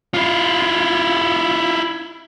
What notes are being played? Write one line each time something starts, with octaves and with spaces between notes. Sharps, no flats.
E4 F4